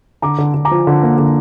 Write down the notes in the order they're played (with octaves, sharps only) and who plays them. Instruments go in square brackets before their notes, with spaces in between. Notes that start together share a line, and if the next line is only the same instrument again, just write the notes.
[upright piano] D3 A#5 D6
D3
D3
A#5 D6
F3
D3
A#3
D3